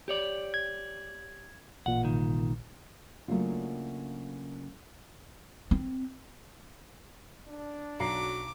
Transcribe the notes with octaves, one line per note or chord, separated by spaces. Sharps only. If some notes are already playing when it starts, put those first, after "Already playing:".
G4 C#5 D5
G#6
A1 A#2 F#5
C2 D#3
C#3 F#3 A3 A#3 D4 F4
C4
D4
B1 F#3 A#5 D6 C7